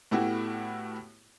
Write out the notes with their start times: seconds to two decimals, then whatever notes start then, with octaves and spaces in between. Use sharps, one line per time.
0.11 A2 A3 B3 E4 F#4 G4